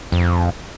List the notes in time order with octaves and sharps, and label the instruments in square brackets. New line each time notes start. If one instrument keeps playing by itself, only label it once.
[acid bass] F2